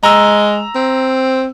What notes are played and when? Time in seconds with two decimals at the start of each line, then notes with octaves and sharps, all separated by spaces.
0.03 G#3 A#5 E6
0.76 C4